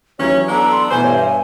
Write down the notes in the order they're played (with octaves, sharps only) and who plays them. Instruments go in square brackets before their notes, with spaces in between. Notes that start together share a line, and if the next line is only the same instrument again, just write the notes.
[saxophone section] D#2 C#4 [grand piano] E3 F#3 [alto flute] C#5
[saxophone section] B3 D4 A4 [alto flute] A#5
[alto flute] C6
[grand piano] B2 E3 B4 [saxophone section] C5 [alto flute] G#5
[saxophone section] G2 [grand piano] C#5 E5